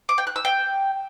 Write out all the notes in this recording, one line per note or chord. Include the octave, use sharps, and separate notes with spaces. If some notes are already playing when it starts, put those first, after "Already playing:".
D6
G5
F#6
E6
G5